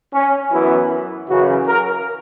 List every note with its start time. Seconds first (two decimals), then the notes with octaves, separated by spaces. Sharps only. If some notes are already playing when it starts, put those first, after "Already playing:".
0.13 C#4
0.51 F#2 E3 B3 E4
1.28 F#2 C#3 E3 F#4
1.67 A#4